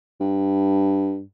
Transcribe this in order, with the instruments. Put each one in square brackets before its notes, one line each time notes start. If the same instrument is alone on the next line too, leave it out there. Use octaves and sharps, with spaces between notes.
[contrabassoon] G2